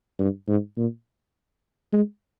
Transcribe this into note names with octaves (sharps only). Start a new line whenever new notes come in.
G2
G#2
A#2
G#3